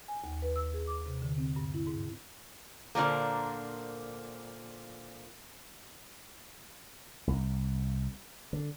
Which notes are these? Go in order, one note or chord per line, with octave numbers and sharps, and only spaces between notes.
G#5
D#2
B4
E6
G#4
D6
C3
D3
C4
G2
E4
G#2
A#2 D3 F3 A#3
C2
D3